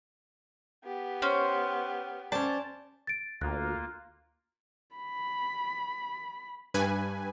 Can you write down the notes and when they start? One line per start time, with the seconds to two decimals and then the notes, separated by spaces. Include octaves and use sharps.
0.84 B3 G4
1.22 C#4 C5
2.32 C#4 C5 D5 A5
3.07 A6 D7
3.41 D2 A#3 F4 F#6
4.96 B5
6.74 G2 B4 G#5